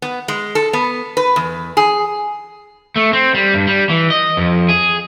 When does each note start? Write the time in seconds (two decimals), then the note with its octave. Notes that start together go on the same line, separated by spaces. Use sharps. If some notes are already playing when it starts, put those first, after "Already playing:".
0.02 B3
0.28 G#3
0.55 A4
0.73 B3
1.17 B4
1.36 E2
1.77 G#4
2.96 A3
3.13 C4
3.34 G3
3.54 G2
3.67 G3
3.89 E3
4.10 D#5
4.37 F2
4.69 G#4